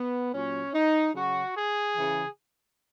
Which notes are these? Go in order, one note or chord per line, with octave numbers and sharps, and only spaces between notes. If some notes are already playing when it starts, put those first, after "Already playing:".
Already playing: B3
A#2 F#3 C#4
D#4
C#3 F#3 F#4
G#4
C#3 E3